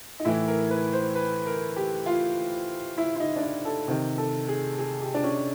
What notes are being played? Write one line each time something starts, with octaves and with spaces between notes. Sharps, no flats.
D#4
A2 E3 E4
A#4
B4
C5
B4
A#4
G4
F4
E4
E4
D#4
D4
D#4
A4
C3 D#3
A4
G#4
G#4
G4
D4
C#4